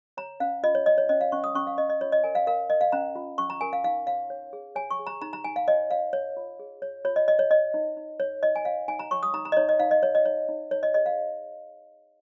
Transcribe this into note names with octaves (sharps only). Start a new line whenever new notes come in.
C#5 A#5
C#4 F5
F4 D#5
C#5
C#5 D#5
C#5
C#4 D#5
F5
C#4 C#6
D#6
C#4 C#6
F5
C#4 D#5
D#5
F4 C#5
D#5
A#4 G#5
F5
A#4 F5
A#4 D#5
F5
C#4 A#5
F4
C#4 C#6
A#5
A#4 G#5
F5
D#4 F5
C#5 F5
C#5
G#4
C#5 G#5
C#6
G#4
A#5
D#4 A#5
A#5
D#4 G#5
F5
C#5 D#5
C#5 F5
C#5
F4
G#4
C#5
F4 C#5
D#5
C#5 D#5
C#5
C#5 D#5
D#4
D#4
C#5
D#4 D#5
G#5
C#5 F5
D#4 G#5
A#5
C#5 C#6
D#6
D#4 A#5
A#5
D#5
D#4 C#5
D#5
D#4 F5
D#5
C#5
D#5
D#4 C#5
D#4
D#4 C#5
D#5
G#4 D#5
F5